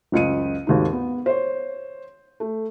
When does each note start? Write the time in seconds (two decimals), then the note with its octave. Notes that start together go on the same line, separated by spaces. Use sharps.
0.12 F#1 C#2 D#5 C#7 D#7
0.67 G#1 D#2 G#3 D#4
0.93 B3
1.26 C5 C#5
2.40 A3